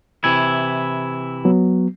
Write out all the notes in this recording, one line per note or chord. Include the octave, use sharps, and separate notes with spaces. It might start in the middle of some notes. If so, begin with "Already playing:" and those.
C3 E3 E4 G#6
F#3 B3